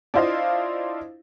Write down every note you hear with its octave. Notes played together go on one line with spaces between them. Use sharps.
D4 E4 F4 C5 D#5 F5